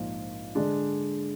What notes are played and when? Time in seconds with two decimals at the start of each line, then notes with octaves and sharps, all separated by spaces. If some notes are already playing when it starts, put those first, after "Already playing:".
Already playing: A#1 G#2 F3 A#3
0.55 D3 G#3 D4